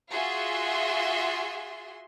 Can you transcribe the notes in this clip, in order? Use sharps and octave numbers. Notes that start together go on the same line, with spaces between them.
F4 F#4 G#4 E5 C6